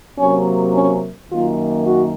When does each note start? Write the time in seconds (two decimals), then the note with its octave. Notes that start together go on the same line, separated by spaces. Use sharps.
0.18 C3 F#3 A#3 C#4
0.74 C#4
1.30 F#2 D#3 A#3 F4
1.86 F#4